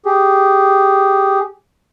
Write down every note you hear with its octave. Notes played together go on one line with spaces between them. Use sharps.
G4 G#4